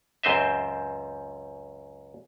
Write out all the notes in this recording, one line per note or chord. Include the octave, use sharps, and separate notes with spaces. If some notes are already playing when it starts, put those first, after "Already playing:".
C#2 F#2 C4 C5 D#5 E5